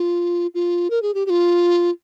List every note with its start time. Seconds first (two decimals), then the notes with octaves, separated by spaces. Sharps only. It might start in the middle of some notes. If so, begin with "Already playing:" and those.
Already playing: F4
0.55 F4
0.90 A#4
1.02 G#4
1.14 G4
1.26 G4
1.30 F4